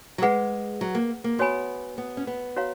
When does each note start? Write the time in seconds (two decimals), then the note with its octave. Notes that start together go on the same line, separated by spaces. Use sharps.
0.18 F#3
0.22 G#3 G#4 B4 F#5
0.81 F#3
0.95 A#3
1.24 A#3
1.39 B3 F#4 C#5 G#5 B5
1.98 B3
2.17 C#4
2.27 B3
2.56 F#4 C#5 F5 A#5